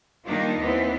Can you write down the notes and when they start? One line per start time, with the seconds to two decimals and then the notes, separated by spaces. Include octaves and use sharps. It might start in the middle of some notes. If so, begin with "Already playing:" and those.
0.25 D#3 G3 A#3 D4 D#4 F4
0.60 D#2 E3 B3 C4